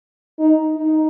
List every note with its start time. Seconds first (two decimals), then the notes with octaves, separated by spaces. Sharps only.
0.40 D#4
0.77 D#4